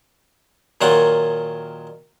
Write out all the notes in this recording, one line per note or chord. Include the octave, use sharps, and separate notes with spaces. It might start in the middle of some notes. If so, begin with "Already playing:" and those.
A#2 D#3 F#3 F4 C#5 F#5